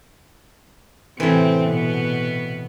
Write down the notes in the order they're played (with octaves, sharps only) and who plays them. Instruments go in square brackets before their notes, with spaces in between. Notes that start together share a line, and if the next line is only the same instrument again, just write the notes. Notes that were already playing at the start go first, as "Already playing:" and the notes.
[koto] A2 C3 E3 [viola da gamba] C4
[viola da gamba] B2 B3